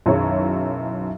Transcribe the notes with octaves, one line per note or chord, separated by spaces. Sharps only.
B1 F#2 D#3 E4 G#4 C#5